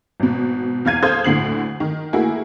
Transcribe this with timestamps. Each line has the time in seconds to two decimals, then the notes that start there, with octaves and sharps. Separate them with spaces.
0.20 G#1 B2
0.85 E2 F5 G#6 D#7
1.03 A4 C5 F5 D#6 G6 G#6
1.24 D2 A2 D3 C7 F#7
1.80 D#3
2.13 A3 A#3 E4 F#4 G#4